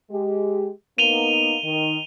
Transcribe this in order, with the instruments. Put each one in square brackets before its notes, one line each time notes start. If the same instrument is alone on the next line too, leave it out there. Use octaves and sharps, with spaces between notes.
[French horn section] G#3 G4
[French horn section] A#3 B3 D#4 [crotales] D#7 F7 G7
[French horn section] D#3